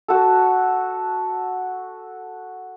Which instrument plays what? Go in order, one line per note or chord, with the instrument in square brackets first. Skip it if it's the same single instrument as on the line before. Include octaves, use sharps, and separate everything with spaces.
[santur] F#4 A4